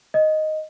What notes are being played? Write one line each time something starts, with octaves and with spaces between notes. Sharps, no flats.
D#5